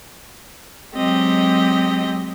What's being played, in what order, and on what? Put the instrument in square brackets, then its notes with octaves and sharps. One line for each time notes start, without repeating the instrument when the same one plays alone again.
[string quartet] F#3 G#3 C4 G4 D#5